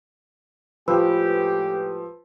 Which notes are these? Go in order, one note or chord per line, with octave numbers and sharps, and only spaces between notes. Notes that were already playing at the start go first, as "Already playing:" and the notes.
A2 F3 G#3 G4 B4 E6